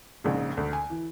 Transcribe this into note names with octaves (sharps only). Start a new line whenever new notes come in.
A#1 G#2 C#3
D2
G#5
E3